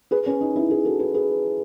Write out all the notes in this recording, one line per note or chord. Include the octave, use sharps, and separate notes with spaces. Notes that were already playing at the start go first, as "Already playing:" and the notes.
G#4 B4
C#4
D#4
C#4 E4
E4 G#4
F#4 A4
G#4 B4
G#4 B4